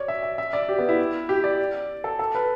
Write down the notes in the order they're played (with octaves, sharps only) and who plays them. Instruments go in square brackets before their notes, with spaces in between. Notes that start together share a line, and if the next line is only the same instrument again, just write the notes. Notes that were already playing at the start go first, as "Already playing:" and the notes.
Already playing: [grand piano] C#5 D5
E5
E5
E5
D5
G4
B3
E4
G4
D5
A4
A4
B4